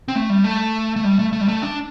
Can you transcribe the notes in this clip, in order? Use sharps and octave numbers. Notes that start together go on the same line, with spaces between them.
C4
A3
G3
A3
A3
G3
A3
A3
G3
A3
D4